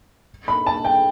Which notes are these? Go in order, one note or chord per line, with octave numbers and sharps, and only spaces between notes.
B5
A5
G5